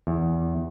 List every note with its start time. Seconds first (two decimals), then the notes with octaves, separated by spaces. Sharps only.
0.07 E2